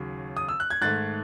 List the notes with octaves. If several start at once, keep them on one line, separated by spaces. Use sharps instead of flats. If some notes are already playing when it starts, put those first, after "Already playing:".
Already playing: D#2 C#3 F#3
D#6
E6
F#6
G#6
G#2 D#3 A3 F#6 A6